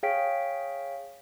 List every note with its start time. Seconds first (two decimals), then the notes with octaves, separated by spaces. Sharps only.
0.03 G#4 C#5 F5 G5 B6 D7